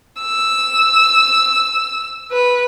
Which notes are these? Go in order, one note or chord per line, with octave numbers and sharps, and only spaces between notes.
E6
B4